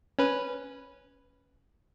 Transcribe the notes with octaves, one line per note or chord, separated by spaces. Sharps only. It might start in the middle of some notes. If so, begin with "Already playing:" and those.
C#4 B4